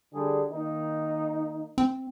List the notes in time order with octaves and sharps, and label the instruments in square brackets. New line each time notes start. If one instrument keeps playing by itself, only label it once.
[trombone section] D3 G3 G#4
D#3 A#3 D#4
[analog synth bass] C4